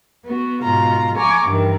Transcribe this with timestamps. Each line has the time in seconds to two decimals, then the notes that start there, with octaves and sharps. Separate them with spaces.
0.24 B3 F#4
0.62 G#2 B2 F4 A#5
1.16 G#5 A#5 C#6 D6
1.47 G2 D#3 E3